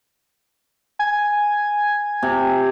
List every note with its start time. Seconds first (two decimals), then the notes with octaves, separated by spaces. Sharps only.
0.99 G#5 G#6
2.23 C3